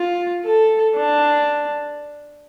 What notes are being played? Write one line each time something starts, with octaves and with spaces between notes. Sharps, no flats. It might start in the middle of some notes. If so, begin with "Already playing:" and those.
Already playing: F4
A4
D4